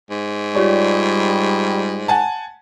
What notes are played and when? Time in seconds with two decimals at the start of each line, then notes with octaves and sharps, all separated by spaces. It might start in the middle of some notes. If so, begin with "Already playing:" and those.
0.10 G#2
0.55 G3 F4 G4 C#5 D5
2.08 F#5 G#5 A5